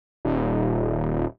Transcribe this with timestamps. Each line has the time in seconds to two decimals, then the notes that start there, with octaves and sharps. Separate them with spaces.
0.25 D#1